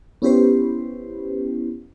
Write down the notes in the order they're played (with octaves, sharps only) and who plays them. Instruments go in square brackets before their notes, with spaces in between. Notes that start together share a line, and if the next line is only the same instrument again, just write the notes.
[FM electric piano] B3 C#4 E4 G4 B4 C5